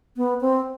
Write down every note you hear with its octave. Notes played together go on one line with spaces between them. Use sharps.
B3
C4